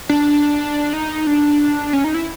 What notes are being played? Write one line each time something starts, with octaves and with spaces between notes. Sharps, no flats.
D4
D#4
D4
C#4
D#4
E4